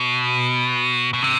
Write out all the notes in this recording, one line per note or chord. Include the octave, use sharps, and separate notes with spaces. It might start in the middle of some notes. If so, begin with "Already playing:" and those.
Already playing: B2
B2
C3